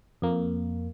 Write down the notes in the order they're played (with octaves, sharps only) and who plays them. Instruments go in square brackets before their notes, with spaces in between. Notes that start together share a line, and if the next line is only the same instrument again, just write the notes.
[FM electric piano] F2 A#3